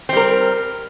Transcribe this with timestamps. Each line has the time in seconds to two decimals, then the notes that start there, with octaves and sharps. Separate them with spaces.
0.09 C4
0.13 G3
0.17 A#4